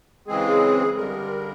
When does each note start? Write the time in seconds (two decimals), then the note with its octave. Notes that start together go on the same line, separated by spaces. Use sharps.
0.27 C#3 E3 G#3 C4 G#4
0.96 G2 D3 G3 A#4